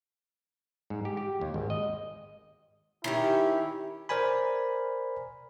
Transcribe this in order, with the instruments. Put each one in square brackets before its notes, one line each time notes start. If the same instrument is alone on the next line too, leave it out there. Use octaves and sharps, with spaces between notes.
[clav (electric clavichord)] G#2
G4
G4
D#2
G#1
D#5
[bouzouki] D#3 C#4 G4 [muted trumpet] E4
[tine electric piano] A#4 C5 D5 G#5 B5